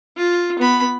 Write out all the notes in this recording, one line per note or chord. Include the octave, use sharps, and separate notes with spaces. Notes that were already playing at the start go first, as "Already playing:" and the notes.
F4
B3 B5